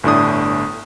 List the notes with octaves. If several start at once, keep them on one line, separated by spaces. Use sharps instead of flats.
G1 A2 D4 D#6